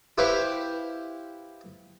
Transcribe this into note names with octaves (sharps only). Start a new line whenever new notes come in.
E4 G4 B4 C5 F5